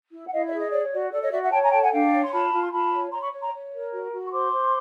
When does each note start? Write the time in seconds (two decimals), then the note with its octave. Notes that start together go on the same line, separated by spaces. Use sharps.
0.12 E4
0.26 F#5
0.32 E4 D#5 F5
0.45 D5 E5
0.53 G#4
0.59 D#5
0.70 C#5 D5
0.82 C#5
0.91 F#4 D5
1.12 A4 D5
1.21 C#5 D#5
1.31 F#4 D5 E5
1.42 E5 F#5
1.51 C#5 G5 A5
1.62 G#5 A#5
1.71 A4 G5 A5
1.81 F#5 G#5
1.91 D4 F5 G5
2.11 C#5
2.21 C6
2.32 F4 A5 B5
2.52 F4
2.62 C6
2.71 F4 A5 B5
2.91 C#5
3.11 C#5 A#5 C6
3.21 B5 C#6
3.31 C#5
3.41 A#5 C6
3.52 C#5
3.72 A#4
3.92 F#4
4.12 F#4
4.26 C#6
4.30 C5 C6 D6
4.51 C5